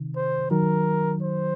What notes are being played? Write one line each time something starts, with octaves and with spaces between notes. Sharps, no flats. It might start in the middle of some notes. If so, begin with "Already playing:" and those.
Already playing: C3 D#3
C5
D#3 F#3 A#4
C5